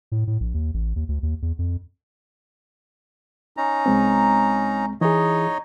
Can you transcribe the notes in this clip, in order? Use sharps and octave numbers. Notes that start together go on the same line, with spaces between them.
A2
A2
A#1
D#2
A1
D#2
D2
D#2
E2
F2
C#4 D#4 A#5
C2 G#3 C4
E3 D#4 E4 G#4 C#5 D#5